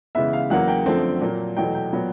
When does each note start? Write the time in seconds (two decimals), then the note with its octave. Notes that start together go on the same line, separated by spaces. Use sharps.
0.15 C#3 E3 G#3 B3 E5
0.33 F5
0.50 E2 C#3 F#3 A#3 F#5
0.68 G5
0.86 F#2 D3 F3 A3 C4
1.21 A#2 F#3 A#3
1.57 E2 B2 F#3 A3 G5
1.75 G5
1.93 A#2 F#3 B3